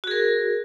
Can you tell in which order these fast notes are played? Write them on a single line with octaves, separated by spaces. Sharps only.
F#4 G#4 A#4